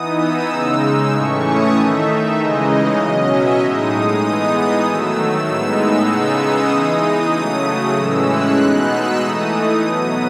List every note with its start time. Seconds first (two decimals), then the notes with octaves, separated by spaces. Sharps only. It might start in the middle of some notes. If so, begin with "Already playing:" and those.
Already playing: E3 B3 D#4 D#6
0.20 E6
0.50 C#3 G#3 D#4
1.12 A2 E3 A3 C#4 C#6
1.43 D#6
1.74 D#3 A3 D#4 E5
2.36 C#3 E3 G#3 D#4 D#5
2.68 D#5
2.98 B2 F#3 C#4
3.30 E5
3.61 A2 G#3 D#4 D#6
4.22 E3 G#3 B3 D#4 D#6
4.84 D#3 F#3 A3 E6
5.47 A2 G#3 B3 D#4 E6
6.09 C#3 G#3 B3 D#4
6.40 D#6
6.71 E3 G#3 D#4
7.33 C#3 F#3 A3 D#6
7.64 D#6
7.95 A2 E3 G#3 C#4 E6
8.26 F#6
8.57 B2 G#3 B3 D#4
8.89 E6
9.20 E3 A3 D#4 D#6
9.50 D#6
9.81 B2 F#3 B3 D#6